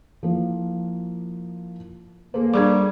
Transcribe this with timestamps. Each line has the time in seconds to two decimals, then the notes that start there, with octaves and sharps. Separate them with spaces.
0.23 F3 A#3 E4
2.34 A#3 G#4 A4 C5
2.54 G3 D4 G#4 C#6 D6 G#6